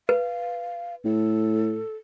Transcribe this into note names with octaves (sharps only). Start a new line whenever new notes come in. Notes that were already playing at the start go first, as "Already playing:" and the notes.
B4 F5
A2 A4